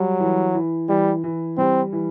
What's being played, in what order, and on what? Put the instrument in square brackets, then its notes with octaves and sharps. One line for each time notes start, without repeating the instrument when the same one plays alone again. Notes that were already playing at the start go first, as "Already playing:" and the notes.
Already playing: [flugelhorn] F#3 [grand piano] G3
[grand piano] E3
E3
[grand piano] E3 [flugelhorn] G3
[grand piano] E3
[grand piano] G3 [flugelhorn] C4
[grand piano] E3